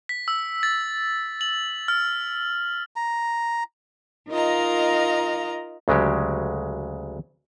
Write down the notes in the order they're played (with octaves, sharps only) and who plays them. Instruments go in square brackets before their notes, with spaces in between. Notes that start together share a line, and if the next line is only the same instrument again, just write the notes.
[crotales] B6
E6
A6
F#7
F6
[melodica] A#5
[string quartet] D#4 F4 A#4 D#5 F5 A#5
[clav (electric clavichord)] D2 C#3 F#3 G#3 G4